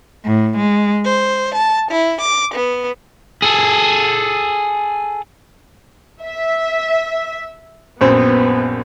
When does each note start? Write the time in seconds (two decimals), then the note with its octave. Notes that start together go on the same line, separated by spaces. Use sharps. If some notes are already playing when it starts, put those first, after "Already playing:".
0.24 A2
0.56 G#3
1.06 C5
1.55 A5
1.91 E4
2.22 D6
2.55 B3
3.42 G#4 A4
6.23 E5
8.01 A#1 F#2 B3 C4